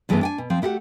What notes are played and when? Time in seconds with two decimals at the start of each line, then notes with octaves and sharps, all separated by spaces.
0.09 G2 E3 G#3 A3 B3 D4
0.21 D4 G5 G#5
0.38 B2
0.50 F3 C4
0.62 A3 E4 F#4 G4 F#5